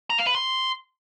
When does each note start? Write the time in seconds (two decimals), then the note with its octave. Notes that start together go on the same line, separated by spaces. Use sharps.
0.10 A#5
0.18 F5
0.27 B4
0.35 C6